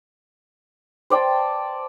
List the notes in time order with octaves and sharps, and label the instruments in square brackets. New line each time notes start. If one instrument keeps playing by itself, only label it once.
[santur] C5 D5 G5 A5